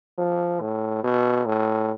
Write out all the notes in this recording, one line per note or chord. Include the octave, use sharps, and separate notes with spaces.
F3
A2
B2
A2